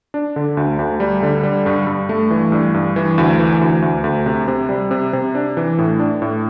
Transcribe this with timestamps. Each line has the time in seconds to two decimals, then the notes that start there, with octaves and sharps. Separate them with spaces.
0.14 D4
0.36 D3
0.57 D2
0.79 D2
1.00 G3
1.23 D3
1.43 G3
1.66 G2
1.87 G2
2.09 A3
2.31 E3
2.52 G2
2.74 G2
2.96 E3
3.18 D2
3.39 E3
3.61 D2
3.82 D2
4.04 D2
4.26 C3
4.48 C3
4.69 G3
4.91 C3
5.13 C3
5.35 D4
5.57 E3
5.79 A2
5.99 D4
6.22 A2